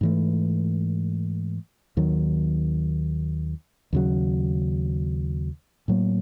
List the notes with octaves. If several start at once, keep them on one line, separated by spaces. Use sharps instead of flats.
G#2 E3 A3
D#2 D#3 F#3
D#2 C#3 F#3
A2 F#3 A#3